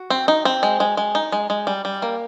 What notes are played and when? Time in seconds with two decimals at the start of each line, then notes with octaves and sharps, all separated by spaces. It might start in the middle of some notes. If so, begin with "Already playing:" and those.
Already playing: F#4
0.10 C4
0.28 D#4
0.45 C4
0.63 G#3
0.80 G#3
0.97 G#3
1.15 D#4
1.32 G#3
1.50 G#3
1.67 G3
1.85 G3
2.02 A#3